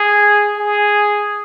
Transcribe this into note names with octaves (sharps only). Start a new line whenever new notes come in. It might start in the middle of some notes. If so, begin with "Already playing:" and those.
Already playing: G#4
G#4